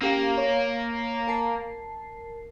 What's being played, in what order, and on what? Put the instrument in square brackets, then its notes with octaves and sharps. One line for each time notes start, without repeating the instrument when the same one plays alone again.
[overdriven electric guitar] A#3 [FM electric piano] C#4 G4 F5
[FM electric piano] C#5
A#4 A5 C7